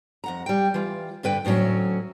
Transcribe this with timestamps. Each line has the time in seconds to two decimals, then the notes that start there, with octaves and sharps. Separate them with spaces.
0.24 F2 F#5 A#5
0.46 G3 G5
0.74 E3 F4
1.23 G2 D3 B4 G5
1.45 D2 A2 E3 F#3 C#4